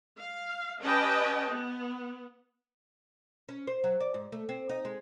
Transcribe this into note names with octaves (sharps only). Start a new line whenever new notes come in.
F5
C#4 G4 B4 D#5 G5 A5
B3
C#4
C5
F#3
D5
G#2
A3
C4
D#4
G#3